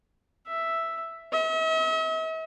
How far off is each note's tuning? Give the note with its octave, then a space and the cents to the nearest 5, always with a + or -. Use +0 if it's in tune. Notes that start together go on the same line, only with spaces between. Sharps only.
E5 +0
E5 -45